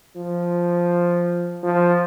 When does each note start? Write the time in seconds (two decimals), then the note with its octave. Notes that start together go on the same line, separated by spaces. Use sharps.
0.17 F3
1.63 F3